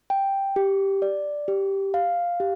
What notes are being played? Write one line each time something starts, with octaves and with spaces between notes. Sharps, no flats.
G5
G4
D5
G4
F5
G4